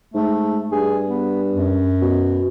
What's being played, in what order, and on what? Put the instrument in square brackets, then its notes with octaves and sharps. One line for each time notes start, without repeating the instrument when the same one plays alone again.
[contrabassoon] G#2 [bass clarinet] A3
[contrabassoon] G2 [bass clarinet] G#4
[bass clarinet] B3
F#2
[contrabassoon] B2